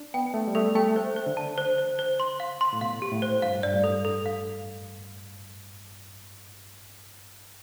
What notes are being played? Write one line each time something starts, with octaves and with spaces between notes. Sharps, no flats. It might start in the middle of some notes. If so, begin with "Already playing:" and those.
Already playing: D4
B3 G5
A3 A4
G3
A3 A4
A3 G5
C5
C5
D3
A5
C5
C5
C5
C6
F5
C6
A2
B2 F5
G4
A2
C5
G2 F5
G2 D5
A2
A4
A4
F5